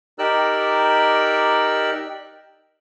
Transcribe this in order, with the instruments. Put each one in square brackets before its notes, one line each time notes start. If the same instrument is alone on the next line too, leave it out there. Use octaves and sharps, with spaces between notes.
[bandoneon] D#4 G4 A#4 D5 E6 F#6